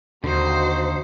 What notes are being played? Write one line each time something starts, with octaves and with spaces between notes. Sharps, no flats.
D#2 D3 D#4 F#4 C5